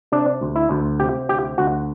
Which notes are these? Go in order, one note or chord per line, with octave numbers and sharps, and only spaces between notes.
C3 D4
D2
E4
D2
C3 G4
D2 G4
D2 F#4